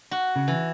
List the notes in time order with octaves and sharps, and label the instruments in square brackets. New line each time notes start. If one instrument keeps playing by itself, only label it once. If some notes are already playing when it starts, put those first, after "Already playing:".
[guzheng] F#4
[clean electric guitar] C#3
[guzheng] E3